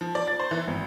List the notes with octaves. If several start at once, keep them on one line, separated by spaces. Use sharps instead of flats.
F3
D5
A6
C5
E3
G#1